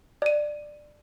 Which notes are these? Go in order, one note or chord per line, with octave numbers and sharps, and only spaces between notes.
D5 D#7